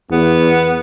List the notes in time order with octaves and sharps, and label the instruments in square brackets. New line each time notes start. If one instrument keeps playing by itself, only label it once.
[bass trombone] E2 [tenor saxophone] B3